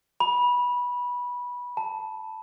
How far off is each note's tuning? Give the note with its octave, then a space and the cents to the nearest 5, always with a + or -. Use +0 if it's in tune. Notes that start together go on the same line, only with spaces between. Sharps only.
B5 -15
A5 +0